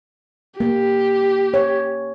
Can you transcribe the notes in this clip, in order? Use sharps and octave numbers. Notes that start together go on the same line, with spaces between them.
A#3 G4
C#5